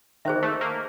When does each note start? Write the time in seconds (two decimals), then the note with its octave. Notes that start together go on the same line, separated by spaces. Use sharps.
0.25 D#3 G#4 C5 E5
0.43 A3
0.61 A#3